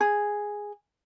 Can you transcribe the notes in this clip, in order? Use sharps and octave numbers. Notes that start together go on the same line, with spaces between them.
G#4